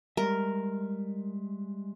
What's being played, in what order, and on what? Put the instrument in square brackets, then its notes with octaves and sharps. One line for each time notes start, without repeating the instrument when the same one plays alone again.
[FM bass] G3 [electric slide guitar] G#3 E5 [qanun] A#4